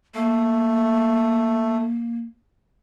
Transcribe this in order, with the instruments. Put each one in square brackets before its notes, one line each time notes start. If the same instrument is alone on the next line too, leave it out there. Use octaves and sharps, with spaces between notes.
[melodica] A3 [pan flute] A#3